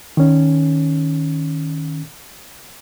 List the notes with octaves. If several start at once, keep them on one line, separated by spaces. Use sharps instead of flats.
D#3 C#4